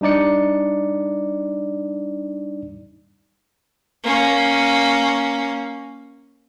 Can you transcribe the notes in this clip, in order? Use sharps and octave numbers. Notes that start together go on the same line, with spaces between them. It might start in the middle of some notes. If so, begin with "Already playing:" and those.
G3 D4 D#4 D5 C#7
A#3 C#4